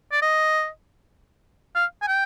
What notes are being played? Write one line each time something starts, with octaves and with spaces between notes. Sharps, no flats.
D5
D#5
F5
G#5
G5